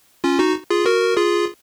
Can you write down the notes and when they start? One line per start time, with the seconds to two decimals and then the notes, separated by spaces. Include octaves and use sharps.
0.24 C#4 F4
0.39 D#4 F#4
0.70 F4 G#4
0.85 F#4 A#4
1.17 F4 G#4